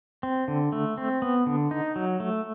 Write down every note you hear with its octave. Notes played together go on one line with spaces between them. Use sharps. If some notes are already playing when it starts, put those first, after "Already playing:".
C4
D3
A3
C4
B3
D3
D#4
F#3
A3